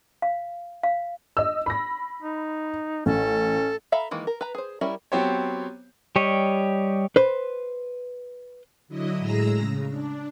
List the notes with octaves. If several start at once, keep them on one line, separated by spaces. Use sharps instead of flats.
F5
F5
D#5 E6
B5 A#6
D#4
A1 C#4 A4
A4 E5 F5 A#5 B5
D#3 E3 G#3 A#3
A#4
B4 A#5
G#4 C5
G3 C#4 E4 A#4 B5
F#3 B3 C4 G4 C5 C#5
G3 G4 C#5 D#5
B4 C5
D3 F#3 E4 D#5
A2 G#3 G#4 A#5 E6 A#6
C#3
D4